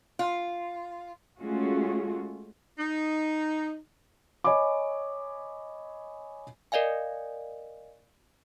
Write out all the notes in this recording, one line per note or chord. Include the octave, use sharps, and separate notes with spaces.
F4
G#3 A3 C#4 F4 F#4 G#4
D#4
C#5 D#5 G#5 B5 D6
A#4 D5 D#5 F5 G#5